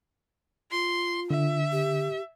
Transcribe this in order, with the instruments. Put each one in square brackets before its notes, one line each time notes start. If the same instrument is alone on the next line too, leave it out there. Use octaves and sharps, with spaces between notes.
[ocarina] F4 [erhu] C6
[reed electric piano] D3 [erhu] E5
[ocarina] G4